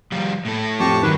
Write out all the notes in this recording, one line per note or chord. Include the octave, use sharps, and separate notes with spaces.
F3 G3
A2 A4
F2 G4 A5 C#6
G2 D#3 F#3 B4